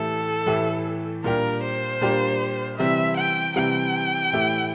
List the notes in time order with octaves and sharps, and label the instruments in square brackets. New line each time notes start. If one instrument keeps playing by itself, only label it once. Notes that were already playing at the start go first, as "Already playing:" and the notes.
Already playing: [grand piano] A2 E3 A3 E4 G4 [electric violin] A4
[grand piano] A2 E3 A3 E4 G4
[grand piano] A#2 G3 D4 G4 [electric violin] A#4
[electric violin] C5
[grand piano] A#2 G3 D4 G4
[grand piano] C3 E3 G3 C4 [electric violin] E5
[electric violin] G5
[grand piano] C3 E3 G3 C4 [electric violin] G5
[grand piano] A2 E3 A3 E4 G4